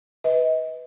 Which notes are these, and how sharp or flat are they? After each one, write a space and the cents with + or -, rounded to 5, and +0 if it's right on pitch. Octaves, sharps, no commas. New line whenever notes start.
B4 +0 D#5 +35